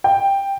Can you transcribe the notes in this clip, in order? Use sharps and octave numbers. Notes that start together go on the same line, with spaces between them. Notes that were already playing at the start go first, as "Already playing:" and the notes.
G5